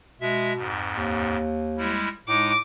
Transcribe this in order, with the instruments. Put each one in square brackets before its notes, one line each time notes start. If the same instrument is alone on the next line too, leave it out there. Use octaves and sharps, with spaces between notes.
[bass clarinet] B2 [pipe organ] G#3 E5
[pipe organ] F2 G#2
[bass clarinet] D#2
[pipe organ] G3 G#3 E4
[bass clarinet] A2 [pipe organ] G#3 D#4 [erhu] D6